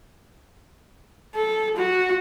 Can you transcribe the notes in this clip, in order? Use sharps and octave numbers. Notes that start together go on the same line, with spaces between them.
A4
F#4